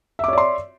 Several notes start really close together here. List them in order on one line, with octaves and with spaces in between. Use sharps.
E5 D6 C#5 D5 C6